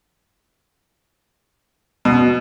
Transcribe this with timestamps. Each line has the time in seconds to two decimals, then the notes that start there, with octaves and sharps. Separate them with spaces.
2.05 B2